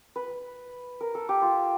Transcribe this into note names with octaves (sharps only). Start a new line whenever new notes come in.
B4
A#4
A4
G4
F4